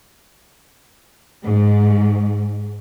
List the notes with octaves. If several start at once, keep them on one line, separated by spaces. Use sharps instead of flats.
G#2